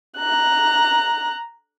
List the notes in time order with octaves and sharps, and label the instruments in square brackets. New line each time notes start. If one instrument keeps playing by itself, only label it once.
[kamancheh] A#5 F#6